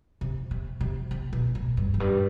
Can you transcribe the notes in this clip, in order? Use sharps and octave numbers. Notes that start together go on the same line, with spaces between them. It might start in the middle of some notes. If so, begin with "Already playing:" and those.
C3
C3
C3
C3
B2
A2
G2
F2
G2